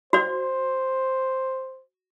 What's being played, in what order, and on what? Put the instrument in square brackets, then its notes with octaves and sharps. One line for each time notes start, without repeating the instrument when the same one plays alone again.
[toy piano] F#4 D5 [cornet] C5